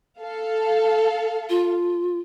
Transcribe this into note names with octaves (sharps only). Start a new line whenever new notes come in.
A4 F5
F4